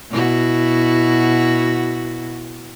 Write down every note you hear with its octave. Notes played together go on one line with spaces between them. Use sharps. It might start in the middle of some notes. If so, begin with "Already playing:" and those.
B2 E4 F#4